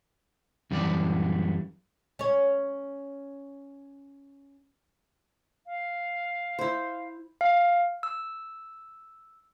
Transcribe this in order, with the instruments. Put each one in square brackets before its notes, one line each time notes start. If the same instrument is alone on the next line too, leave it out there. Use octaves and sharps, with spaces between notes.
[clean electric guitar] F#2 E3 G3 D5
[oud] C#4 C#5
[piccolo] F5
[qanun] E4 C5
[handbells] F5
E6